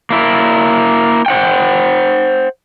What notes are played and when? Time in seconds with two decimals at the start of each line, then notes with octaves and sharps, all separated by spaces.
0.10 A#3 E4
1.26 C5 F#5 G5